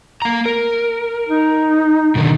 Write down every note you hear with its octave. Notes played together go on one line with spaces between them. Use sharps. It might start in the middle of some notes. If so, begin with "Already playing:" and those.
A#3 A#5
A#4
D#4
B2 D3 D#3